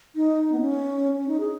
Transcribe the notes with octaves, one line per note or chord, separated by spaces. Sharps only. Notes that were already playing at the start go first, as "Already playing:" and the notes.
D#4
B3
C#4
C#4
D#4
G#4